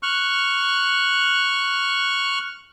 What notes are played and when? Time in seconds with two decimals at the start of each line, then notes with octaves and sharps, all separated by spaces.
0.03 C#6 F6 F#6